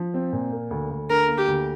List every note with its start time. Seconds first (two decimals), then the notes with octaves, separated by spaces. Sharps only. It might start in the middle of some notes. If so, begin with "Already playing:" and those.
Already playing: F3
0.14 C4
0.33 A#2
0.52 A#3
0.71 D2
0.91 D2
1.10 D3 A#4
1.28 A#3
1.38 G4
1.48 D2